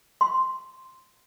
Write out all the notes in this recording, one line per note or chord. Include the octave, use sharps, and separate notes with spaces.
C6